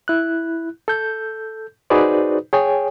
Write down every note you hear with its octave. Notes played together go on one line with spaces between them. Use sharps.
E4 F#6
A4 G6
D#4 F#4 G#4 B4 C5 D5
G#4 C#5 G5 G#5